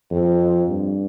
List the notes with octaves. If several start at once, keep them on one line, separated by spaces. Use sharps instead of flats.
F2
G2